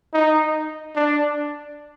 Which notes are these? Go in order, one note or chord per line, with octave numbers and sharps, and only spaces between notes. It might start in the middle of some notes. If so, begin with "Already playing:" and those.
D#4
D4